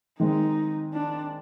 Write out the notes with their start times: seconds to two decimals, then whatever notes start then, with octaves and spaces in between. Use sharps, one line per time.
0.19 D#3 G#3 C4 D#4
0.93 D4